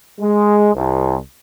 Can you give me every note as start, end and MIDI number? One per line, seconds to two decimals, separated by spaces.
0.20 0.70 56
0.74 1.15 36